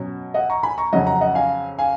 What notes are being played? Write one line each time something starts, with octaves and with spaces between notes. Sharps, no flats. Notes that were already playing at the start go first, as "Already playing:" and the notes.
Already playing: B2 F#3 C#4
D#5 F#5
A#5 C#6
G#5 B5
A#5 C#6
F2 C#3 F#3 C#4 D#5 F#5
F#5 A#5
D#5 F#5
F5 G#5
F5 G#5